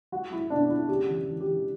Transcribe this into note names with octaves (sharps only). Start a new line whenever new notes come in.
F#3 F#4
F#3 E4
B2 D4
F#3 E4
C#3 G4
E3
E3
G4
E3